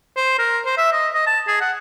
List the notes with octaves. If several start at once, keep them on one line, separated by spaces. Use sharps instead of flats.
C5
A#4
C5
E5
D#5
D#5
A5
G#4
F#5